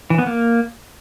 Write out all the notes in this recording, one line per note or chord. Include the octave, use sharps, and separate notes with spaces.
E3
B3
A#3